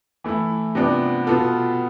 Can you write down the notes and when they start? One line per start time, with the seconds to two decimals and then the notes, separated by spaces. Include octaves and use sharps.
0.24 E3 A3 E4
0.75 C3 F3 B3 D4
1.27 B2 B3 F4 A4